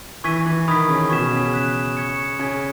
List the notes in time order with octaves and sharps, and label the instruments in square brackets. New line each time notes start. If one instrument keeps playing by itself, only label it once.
[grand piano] E3 [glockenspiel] C#6 G#6 B6 D#7
[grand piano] E3
[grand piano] D#3 [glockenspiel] B5 D#6 G#6 B6
[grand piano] C#3
[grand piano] B2 [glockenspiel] C#6 G#6 B6 E7
[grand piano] C#3
[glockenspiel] F#6 B6 E7
C#6 G#6 C#7
[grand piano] C#3 [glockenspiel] G#5 C#6 G#6